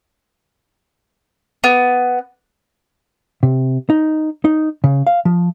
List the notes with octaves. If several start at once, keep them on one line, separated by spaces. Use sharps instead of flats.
B3
C3
D#4
D#4
C#3
F5
F3